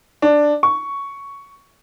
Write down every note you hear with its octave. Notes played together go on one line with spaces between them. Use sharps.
D4
C#6